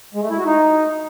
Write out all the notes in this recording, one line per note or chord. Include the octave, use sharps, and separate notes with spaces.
G#3
A3
E4
F#4
D#4